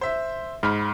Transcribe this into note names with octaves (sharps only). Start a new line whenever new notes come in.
C5 E5
G#2 B5 F6